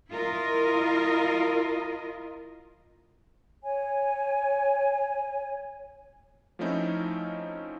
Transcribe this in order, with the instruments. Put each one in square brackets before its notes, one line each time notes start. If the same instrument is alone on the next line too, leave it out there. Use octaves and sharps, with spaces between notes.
[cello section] E4 F4 A#4 D#5
[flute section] C#5 G#5
[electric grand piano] F3 A3 C4 C#4 D#4 E4